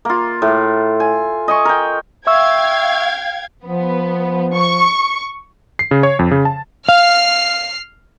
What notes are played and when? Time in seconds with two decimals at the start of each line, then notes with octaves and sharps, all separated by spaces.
0.05 A#3 F4
0.42 A2
1.00 G#5
1.48 D#5 G#5 C#6
1.65 A#4 G5
2.27 E5 F5 G5 C#6 E6 G#6
3.65 F3 B3
4.54 C#6
5.79 C7
5.91 C#3
6.03 C#5
6.19 F2
6.31 C#3
6.45 A5
6.89 F5 F6 C7